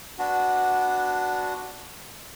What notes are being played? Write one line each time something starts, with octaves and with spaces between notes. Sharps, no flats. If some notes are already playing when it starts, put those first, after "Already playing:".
B3 D4 F#4